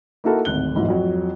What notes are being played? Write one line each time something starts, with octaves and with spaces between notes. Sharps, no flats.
A#3 D#4 E4 F#4 A4 A#4
D1 G#1 F#6 G7
F2 G#2 E3 F#3
F2 F#3